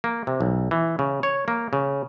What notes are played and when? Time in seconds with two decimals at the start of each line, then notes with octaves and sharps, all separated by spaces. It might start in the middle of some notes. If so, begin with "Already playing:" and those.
0.04 A#3
0.27 C3
0.40 B1
0.71 E3
0.99 C#3
1.23 C#5
1.48 A#3
1.73 C#3